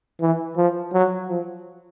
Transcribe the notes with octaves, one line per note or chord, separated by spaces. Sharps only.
E3
F3
F#3
F3